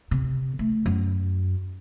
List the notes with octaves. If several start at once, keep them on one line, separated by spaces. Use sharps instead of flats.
C3
A3
F#2